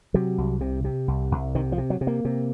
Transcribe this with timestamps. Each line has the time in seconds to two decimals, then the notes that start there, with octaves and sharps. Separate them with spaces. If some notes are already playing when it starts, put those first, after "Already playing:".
0.14 C3 F#3
0.38 C2
0.61 C3
0.84 C3
1.08 C2
1.32 C2
1.55 C3 D#3
1.72 F3
1.78 C3
1.90 F#3
2.01 C3
2.07 A#3
2.25 C3